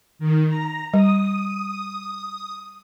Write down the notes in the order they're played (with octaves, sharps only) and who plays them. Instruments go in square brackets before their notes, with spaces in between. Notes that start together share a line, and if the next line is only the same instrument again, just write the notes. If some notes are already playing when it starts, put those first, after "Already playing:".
[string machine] D#3
A#5
[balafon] G3 [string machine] D#6